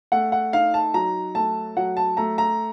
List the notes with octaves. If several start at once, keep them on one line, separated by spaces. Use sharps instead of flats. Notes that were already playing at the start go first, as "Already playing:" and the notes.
A3 F#5
F#5
D#4 F5
A5
F#3 A#5
A3 A5
F#3 F#5
A5
A3 A#5
A#5